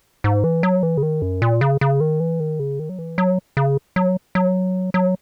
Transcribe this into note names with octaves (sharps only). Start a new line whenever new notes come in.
G#2
E3
F#3
E3
C#3
D#3
F#2
A#2
C#3
C#3
D#3
E3
D#3
C#3
D#3
F#3
E3
F#3
C#3
F#3
F#3
F#3